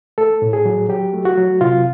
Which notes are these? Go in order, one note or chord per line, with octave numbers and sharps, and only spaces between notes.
A3 A4
A2
G#4
F#3
F#3 G4
A3
F#4
F#3
C3 F4